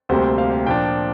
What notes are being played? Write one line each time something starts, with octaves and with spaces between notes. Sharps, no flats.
D2 C3 G3 A#3 C5
F5
F5
A#2 F3 D4 G5